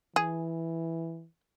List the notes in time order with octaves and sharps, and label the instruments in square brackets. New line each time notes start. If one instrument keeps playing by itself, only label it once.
[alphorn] E3 [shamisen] G#4